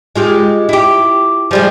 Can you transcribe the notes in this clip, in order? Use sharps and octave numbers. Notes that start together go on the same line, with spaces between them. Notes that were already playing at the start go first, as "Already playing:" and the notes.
G#3 F4 G4
E4 G4
F3 G3 G#3